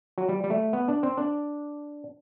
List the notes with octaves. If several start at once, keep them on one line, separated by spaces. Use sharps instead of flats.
F#3
G3
G3
A3
B3
D4
C4
D4